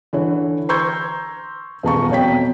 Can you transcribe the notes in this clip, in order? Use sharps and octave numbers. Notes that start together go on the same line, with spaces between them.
D3 E3 C#5
A#5 C6 C#6 E6 G6 G#6
D#1 E2 F5 A5 A#5 C#6
F2 B2 C#5 G5 B6